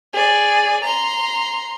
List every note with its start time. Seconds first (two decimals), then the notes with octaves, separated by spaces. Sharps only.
0.13 G#4 D5
0.84 A#5 C6